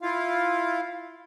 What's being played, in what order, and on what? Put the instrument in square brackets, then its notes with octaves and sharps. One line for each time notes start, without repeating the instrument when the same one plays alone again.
[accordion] E4 F4 F5